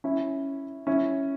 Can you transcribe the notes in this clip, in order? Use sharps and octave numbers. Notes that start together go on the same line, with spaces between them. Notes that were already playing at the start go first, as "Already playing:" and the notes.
C#4 E4
C#4 E4